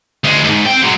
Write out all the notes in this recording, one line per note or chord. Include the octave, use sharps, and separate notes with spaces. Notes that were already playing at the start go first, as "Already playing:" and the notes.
D2 G#3
C#2 G#2
C4 G5
F#3 G#3